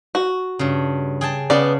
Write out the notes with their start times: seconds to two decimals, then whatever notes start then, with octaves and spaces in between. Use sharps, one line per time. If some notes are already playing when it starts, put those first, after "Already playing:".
0.15 F#4
0.59 G2 C#3
1.21 G#4 G5 A5
1.50 C#3 B3 D5 A5